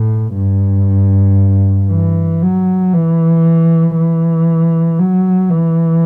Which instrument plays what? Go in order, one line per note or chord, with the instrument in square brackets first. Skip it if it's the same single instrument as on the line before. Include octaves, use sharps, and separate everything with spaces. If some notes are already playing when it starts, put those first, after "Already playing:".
Already playing: [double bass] A2
G2
E3
F#3
E3
E3
F#3
E3